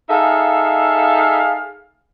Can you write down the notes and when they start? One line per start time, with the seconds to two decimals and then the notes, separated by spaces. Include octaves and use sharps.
0.10 D#4 G#4 A4 E5 F5